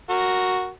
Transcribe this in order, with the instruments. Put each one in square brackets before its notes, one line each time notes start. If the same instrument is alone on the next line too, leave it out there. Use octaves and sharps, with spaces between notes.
[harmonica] F#4 A#4